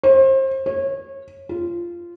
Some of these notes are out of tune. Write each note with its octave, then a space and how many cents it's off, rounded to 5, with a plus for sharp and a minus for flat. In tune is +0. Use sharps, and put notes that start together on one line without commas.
C5 +35
C#5 -25
F4 -15